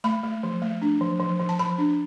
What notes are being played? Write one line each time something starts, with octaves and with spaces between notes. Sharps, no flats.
A3 B5
A3
F3
A3
D4
F3
F3
F3
A5
F3 B5
D4